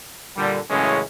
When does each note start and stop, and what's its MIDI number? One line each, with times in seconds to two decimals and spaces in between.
0.37 0.59 46
0.37 0.59 50
0.37 0.59 55
0.70 1.01 42
0.70 1.01 45
0.70 1.01 49
0.70 1.01 52
0.70 1.01 56
0.70 1.01 61